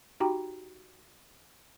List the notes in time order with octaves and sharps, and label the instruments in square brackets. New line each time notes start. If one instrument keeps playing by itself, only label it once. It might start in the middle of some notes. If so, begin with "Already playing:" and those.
[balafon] D#4 F#4 G4 G5 A#5